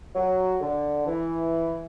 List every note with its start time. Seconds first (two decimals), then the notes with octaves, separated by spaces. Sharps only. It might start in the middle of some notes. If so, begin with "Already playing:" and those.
0.15 F#3
0.61 D3
1.06 E3